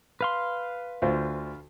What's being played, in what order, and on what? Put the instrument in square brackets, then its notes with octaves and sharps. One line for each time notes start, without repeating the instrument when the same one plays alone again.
[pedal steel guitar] B4 F5 C6
[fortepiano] D2 F4 C5